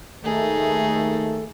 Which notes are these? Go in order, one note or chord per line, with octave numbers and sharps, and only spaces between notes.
D#2 D#3 A3 D#4 G#4 A4